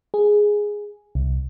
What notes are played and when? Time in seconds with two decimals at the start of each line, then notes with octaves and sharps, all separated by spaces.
0.14 G#4
1.15 C2